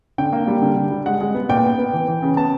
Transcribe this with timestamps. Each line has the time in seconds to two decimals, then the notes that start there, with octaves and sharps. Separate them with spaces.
0.18 D3 G5
0.33 A#3
0.47 G3
0.62 D3
0.77 D3
0.91 G3
1.06 G#3 F#5
1.21 G#3
1.35 B3
1.49 A#2 G5
1.64 B3
1.78 B3
1.93 E3
2.08 E3
2.22 C#3
2.37 B3 A5